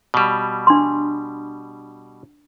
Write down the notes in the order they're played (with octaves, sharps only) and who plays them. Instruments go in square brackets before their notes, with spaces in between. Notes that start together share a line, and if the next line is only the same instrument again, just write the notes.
[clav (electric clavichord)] B2 G3
[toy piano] D4 C6